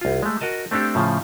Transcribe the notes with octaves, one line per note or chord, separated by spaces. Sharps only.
C2 F4
G#3 A3
F#4 A#4 D#5 A5
A3 C4 D4 G4 A4
A2 C#3 F3